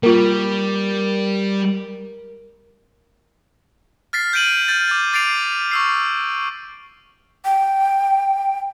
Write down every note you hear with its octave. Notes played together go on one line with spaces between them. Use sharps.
G3 A#3 F4 A#4
F6 A6 B6 C7
G6 B6 D7 D#7 F#7
F6 G6 A6
D6 A6
D6 A6 C7 D7 F7
C#6 E6 C7
G5